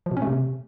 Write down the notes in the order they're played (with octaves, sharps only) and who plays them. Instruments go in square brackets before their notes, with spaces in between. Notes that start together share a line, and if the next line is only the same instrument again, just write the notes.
[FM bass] F3
B2
C#4
A3
C3